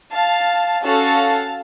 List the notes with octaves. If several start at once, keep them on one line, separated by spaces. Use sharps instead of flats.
F5 A5
C#4 F#4 A4 F5 A5